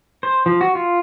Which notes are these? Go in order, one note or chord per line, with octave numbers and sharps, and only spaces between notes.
C5
F3
F#4
F4